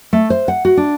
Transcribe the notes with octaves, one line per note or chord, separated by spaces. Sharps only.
A3
C5
F#5
F#4
D4